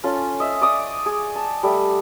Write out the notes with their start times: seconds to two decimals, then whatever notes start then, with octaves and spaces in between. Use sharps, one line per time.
0.04 C#4 F4 A4
0.40 D#5 E5
0.61 D5 C#6 D#6
1.06 G#4
1.36 A5
1.63 G3 A3